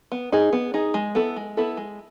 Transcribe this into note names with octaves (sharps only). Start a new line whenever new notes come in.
B3
D#4 G#4
B3
D#4 G#4
G#3
B3 E4 A4
G#3
B3 E4 A4
G#3